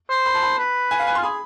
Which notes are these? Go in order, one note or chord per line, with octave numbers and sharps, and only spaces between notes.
C5
B5
A5
B5
B4
G#5
F5
G#5
F4 C6
G#4 B5